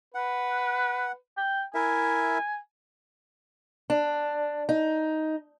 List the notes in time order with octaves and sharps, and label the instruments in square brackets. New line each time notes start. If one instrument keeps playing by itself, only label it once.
[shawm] B4 [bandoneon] F#5
[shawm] G5
[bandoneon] E4 A#4 E5 [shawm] G#5
[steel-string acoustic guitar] D4
D#4